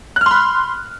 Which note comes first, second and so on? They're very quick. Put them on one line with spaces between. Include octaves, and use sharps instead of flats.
F#6 F6 C6 B5